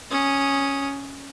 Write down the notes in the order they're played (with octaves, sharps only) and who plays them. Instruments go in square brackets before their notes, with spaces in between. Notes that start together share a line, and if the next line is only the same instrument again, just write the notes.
[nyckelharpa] C#4 D#6